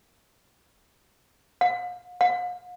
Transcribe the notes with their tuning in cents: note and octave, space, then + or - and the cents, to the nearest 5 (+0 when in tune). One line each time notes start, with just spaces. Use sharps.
F5 +40
F5 +40